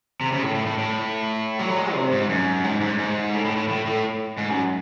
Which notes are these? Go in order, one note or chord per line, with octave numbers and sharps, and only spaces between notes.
C3
C#3
A2
A2
A2
A2
F#3
G#3
C3
G#2
F#2
G#2
G#2
G#2
A2
A2
A2
A2
A2
G#2
F#2